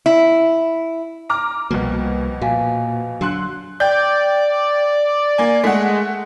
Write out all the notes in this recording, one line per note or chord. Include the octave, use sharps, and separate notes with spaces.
E4
A#5 D6 F6
C2 F2 B2 G3 A#3 F#4
A#2 F#4 F5 G#5
D3 F#3 C6 F#6
D5 G5 G6
A#3 G#5
G#3 A3 F#5